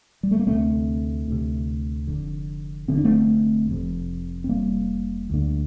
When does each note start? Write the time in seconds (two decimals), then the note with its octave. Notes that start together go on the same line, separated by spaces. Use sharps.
0.23 G3
0.31 A3
0.39 A#3
0.47 D2 C3 A3 C4
1.28 D2 C3
2.08 F1 F2 D3
2.88 F1 F2 D3 C4
2.97 D4
3.05 A3 C4
3.69 F1 F2 C3
4.44 C4
4.49 F1 F2 C3 G3 A#3
5.30 D2 D3